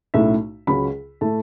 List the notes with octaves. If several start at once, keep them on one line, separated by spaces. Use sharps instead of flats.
B1 A2 A3 C#4 E4 E5
C#2 C#3 F#3 C#4 B5
A2 A3 E4 A5